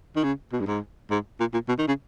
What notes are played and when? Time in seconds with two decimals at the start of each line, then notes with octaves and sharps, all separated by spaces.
0.16 D#3
0.24 C#3
0.53 B2
0.60 G2
0.67 G#2
1.10 G#2
1.40 A#2
1.54 A#2
1.68 B2
1.78 D#3
1.88 C#3